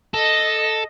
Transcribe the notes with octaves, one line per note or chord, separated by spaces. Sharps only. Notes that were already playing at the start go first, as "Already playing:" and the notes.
A4 D#5